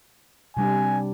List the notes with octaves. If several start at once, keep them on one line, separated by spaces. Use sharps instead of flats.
C3 G3 D4 G#5